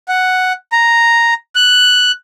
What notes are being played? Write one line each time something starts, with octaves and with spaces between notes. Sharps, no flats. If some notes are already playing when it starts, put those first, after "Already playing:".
F#5
A#5
F#6